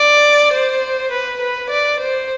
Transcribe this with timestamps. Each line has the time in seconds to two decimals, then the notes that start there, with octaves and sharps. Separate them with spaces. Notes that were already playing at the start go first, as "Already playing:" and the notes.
Already playing: D5
0.53 C5
1.11 B4
1.41 B4
1.70 D5
1.99 C5